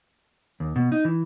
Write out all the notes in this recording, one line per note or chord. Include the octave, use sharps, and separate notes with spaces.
D#2
B2
D#4
E3